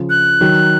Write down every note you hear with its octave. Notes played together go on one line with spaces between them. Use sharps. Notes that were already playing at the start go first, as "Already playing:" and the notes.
Already playing: C#3 F3
F#6
D#3 F#3